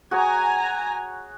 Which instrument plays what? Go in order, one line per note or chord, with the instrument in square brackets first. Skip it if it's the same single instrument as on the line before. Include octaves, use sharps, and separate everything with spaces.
[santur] F#4 G#4 C#5 [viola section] G#5 A#5